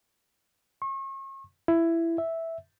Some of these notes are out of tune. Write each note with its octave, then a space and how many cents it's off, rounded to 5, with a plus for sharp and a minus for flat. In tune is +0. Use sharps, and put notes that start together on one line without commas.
C#6 -40
E4 +15
E5 -5